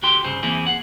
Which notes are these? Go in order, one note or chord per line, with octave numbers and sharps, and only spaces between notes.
D2 D3 F#4 G4 G5 C6
C2 G2 C#3 G#4 C5
E2 E3 A#3 C4 E4 G#4
G#4 F#5